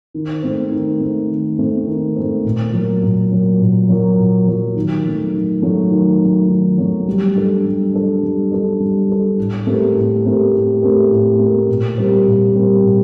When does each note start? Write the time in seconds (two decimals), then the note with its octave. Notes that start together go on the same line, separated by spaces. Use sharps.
0.14 D#3
0.43 A3 C4
0.72 D#3
1.00 A3 C4
1.30 D#3
1.58 A3 C4
1.87 D#3
2.16 A3 C4
2.45 A#2
2.73 F#3 A#3
3.03 A#2
3.31 F#3 A#3
3.61 A#2
3.89 F#3 A#3
4.18 A#2
4.47 F#3 A#3
4.76 D#3
5.04 F#3 A3
5.33 D#3
5.62 F#3 A3
5.91 D#3
6.21 F#3 A3
6.49 D#3
6.78 F#3 A3
7.07 G3
7.36 D4 A4
7.64 G3
7.94 D4 A4
8.22 G3
8.51 D4 A4
8.80 G3
9.09 D4 A4
9.37 A2
9.67 A3 C4 G4 A#4
9.96 A2
10.24 A3 C4 G4 A#4
10.53 A2
10.81 A3 C4 G4 A#4
11.10 A2
11.39 A3 C4 G4 A#4
11.69 A#2
11.98 G3 C4 G4 A#4
12.26 A#2
12.55 G3 C4 G4 A#4
12.84 A#2